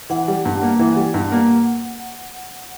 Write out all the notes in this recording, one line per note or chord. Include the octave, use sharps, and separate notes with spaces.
E3 F#5
G3
G2
A#3
E3
G3
G2
A#3